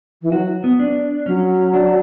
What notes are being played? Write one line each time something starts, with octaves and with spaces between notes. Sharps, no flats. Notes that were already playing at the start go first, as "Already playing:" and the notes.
E3
F#3 F#4
B3
D4
F#3 C#4
D4